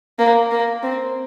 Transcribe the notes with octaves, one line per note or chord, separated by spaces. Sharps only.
A#3
A#3
C4